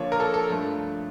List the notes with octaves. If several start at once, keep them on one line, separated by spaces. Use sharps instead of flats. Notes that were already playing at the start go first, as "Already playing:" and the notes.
Already playing: D3 F3 A#3 D4 F4 C#5
A#4
A4
A4
G2 F3 A3